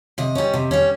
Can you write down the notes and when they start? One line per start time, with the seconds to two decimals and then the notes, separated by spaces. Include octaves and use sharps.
0.18 C3 D#5
0.35 G3 C#4
0.54 C3
0.71 G3 C#4